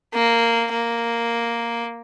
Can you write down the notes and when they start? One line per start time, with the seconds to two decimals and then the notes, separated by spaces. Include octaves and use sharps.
0.13 A#3
0.72 A#3